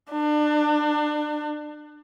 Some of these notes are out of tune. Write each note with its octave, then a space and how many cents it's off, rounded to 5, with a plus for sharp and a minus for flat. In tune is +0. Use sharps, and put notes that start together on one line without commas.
D4 +30